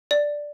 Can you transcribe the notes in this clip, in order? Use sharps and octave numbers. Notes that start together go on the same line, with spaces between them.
D5